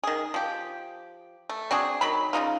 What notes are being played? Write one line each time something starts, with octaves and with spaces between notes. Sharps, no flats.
D#3 G#4
F3 G4
A3
C4 D4 F#4 G#4
D#3 F#3 B5
C#3 A#3 D#4 F4